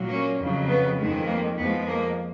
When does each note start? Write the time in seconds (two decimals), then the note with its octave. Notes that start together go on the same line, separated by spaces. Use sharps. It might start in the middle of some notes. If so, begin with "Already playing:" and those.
Already playing: A#2 F#3
0.09 A#3 C#4
0.39 F2 C#3 F#3
0.68 B3
0.97 F2 D#3 G#3
1.27 A#3
1.56 F2 F3 G#3 B3
1.86 A#3